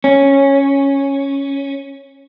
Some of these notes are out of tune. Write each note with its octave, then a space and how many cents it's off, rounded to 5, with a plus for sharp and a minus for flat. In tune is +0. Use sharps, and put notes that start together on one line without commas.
C#4 -5